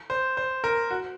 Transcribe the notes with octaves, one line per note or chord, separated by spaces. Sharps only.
C5
C5
A#4
F#4